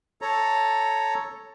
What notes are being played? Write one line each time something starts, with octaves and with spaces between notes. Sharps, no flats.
A4 C#5 A#5